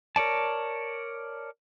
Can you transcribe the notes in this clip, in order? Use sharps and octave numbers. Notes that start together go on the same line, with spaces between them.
A#4 C#5 D5 A5